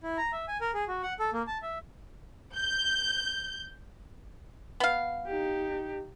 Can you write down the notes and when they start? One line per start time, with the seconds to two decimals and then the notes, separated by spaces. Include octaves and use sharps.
0.03 E4
0.18 A#5
0.33 E5
0.48 G#5
0.61 A#4
0.74 G#4
0.88 F#4
1.03 F#5
1.19 A4
1.33 A#3
1.47 A5
1.62 E5
2.57 G6
4.80 B3 F5
5.27 D#4 G4